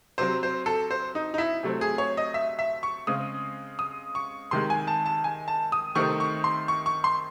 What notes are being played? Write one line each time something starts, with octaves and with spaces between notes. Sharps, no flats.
C3 F#3 C4 C5
C5
A4
C5
D#4
D#4
E4
C3 F#3 A3 C4
G#4
C#5
D#5
E5
E5
C#6
C#3 G#3 C4 D#6
D#6
C#6
C3 D#3 G#3 C6
G#5
A5
A5
G#5
A5
D#6
C3 D#3 A3 C4 C#6
C#6
C6
C#6
C#6
C6